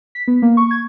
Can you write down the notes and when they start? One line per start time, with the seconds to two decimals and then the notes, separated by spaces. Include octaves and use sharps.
0.15 B6
0.28 B3
0.42 A#3
0.57 C#6
0.71 G#6